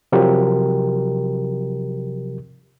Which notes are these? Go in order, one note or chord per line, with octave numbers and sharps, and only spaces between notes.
C3 F3 F#3 G4 A#4